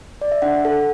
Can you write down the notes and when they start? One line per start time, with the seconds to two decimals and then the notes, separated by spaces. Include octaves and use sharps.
0.21 D5
0.32 E5
0.42 D4 F#5
0.65 A4